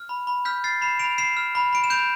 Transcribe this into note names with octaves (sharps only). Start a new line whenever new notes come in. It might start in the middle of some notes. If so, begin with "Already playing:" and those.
Already playing: F6
B5
B5
F6 G6 B6
F6 A6 C7
B5 C7 E7
B5 D7 F7
F6 C7 E7
F6
B5
B5 D7
E7
G6 D7 F7